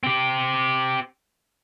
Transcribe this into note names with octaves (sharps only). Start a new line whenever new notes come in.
C4 G4